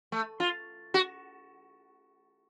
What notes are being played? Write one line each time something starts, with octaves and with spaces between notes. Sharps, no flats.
A3
F4
F#4